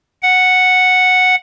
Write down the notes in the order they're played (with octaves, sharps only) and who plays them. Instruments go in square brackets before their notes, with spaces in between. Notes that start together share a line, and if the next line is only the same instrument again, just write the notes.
[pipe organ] F#5